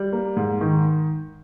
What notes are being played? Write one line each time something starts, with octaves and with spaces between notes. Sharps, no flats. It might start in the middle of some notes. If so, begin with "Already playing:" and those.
Already playing: G3
A#3
G#2
D#3